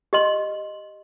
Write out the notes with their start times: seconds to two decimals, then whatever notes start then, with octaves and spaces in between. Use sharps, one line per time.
0.13 G4 D#5 C6